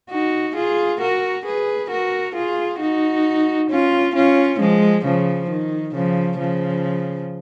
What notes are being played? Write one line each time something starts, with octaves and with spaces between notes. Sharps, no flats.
D#4 F#4
F4 G#4
F#4 A#4
G#4 B4
F#4 A#4
F4 G#4
D#4 F#4
C#4 F4
C#4 F4
F3 G#3
C#3 F3
D#3
C#3 F3
C#3 F3